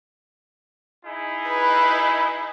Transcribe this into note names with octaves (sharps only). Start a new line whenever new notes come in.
D#4 E4 G#4
B4